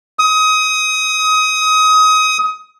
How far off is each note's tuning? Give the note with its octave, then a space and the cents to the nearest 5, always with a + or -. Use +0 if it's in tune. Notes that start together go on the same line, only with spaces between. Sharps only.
D#6 +25